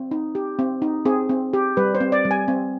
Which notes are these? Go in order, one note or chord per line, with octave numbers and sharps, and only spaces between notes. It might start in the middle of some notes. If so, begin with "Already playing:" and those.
Already playing: C4
D#4
G4
C4
D#4
C4 G#4
C4
G4
G3 B4
C5
C4
D5
G3
G#5
C4